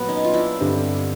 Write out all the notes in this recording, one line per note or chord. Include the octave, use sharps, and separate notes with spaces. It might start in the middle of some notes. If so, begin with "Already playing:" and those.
Already playing: A#2 F#3 B3
C#4 D#4
F4
D4 E4
G2 D3 G3 C4